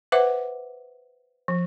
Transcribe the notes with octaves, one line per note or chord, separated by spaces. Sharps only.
B4 C5 E5 F#5 D6
F3